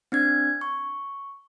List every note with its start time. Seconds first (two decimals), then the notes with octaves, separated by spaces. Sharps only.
0.12 C4 D4 G#6
0.61 C#6